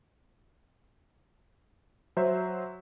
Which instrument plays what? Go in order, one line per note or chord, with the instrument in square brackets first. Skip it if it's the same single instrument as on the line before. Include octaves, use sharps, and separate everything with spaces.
[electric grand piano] F#3 C5 E5